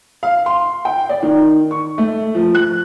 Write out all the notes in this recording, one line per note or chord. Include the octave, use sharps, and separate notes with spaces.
F5
C6
G5
D5
D#3
C#6
A3
F3
F#6